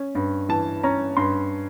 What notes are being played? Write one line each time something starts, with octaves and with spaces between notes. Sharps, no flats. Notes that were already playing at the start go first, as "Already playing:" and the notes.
Already playing: C#4
G2
E3 A5
C#4 A#5
G2 C6